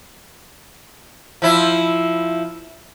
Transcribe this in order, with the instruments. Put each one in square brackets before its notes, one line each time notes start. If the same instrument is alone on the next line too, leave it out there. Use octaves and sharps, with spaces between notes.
[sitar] F3 E4